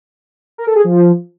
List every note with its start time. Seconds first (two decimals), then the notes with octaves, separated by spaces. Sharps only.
0.58 A#4
0.67 A4
0.76 G#4
0.84 F3